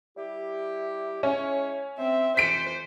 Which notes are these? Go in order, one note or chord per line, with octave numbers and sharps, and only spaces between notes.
G3 E4 G4
G#3 C#4 E4 C#5
C4 E5
F2 E3 C5 B6 C#7 D7